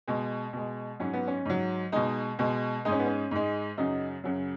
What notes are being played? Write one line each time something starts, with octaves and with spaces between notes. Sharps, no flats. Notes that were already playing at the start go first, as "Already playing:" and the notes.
B2 G#3
B2 G#3
G#2 F#3 C#4
B3
C#4
G#2 F#3
B2 G#3 D#4
B2 G#3
G#2 G#3 C#4 D#4
B3
C#4
G#2 G#3
F#2 C#3 F#3 D#4
F#2 C#3 F#3